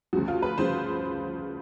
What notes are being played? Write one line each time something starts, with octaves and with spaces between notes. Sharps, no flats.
D2 C#3 F3 F#4
F4
B4
C#3 F3 C5